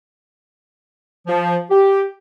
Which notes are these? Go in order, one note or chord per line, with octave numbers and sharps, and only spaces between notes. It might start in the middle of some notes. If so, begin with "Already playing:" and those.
F3
G4